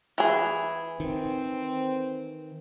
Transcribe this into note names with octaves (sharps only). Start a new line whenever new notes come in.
E3 G#4
D#3 C4